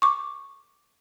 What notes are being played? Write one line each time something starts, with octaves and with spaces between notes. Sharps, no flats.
C#6 D6